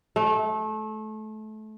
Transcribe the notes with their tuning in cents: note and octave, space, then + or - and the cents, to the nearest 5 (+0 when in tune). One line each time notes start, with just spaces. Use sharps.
A3 -25